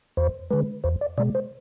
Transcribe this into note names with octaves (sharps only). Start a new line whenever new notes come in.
E2 C5
D3 G#3 B4
E2 C5
D5
B2 G#3 D5
C5